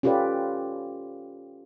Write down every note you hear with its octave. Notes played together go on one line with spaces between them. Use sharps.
C#4 F4 G4 A4 B4 D5